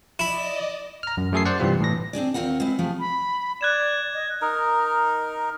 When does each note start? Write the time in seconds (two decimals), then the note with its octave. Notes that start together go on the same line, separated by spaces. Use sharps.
0.19 E4 D5 D#5 B5
1.03 A#5 F6
1.17 F#2
1.33 F#2 A3 G#4 A4 G#5 C7
1.45 C5 D5 F#5
1.60 G2 C3 E3 G3 C4 F4
1.80 A2 E3 A#6
2.13 C4 D4 G#4 D5
2.34 D#2 C4 F4 A#4 F#5
2.60 G#3 C4 E4
2.78 C3 F3 A3 G#4
3.00 B5
3.61 D5 F#6 G#6 E7
4.14 D#5
4.42 D#4 A#4